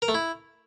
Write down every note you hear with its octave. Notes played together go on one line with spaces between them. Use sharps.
A#4
A3
E4